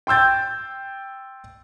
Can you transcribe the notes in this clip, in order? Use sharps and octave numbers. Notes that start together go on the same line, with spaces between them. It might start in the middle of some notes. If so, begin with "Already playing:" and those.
G5 C6 E6 G6 A6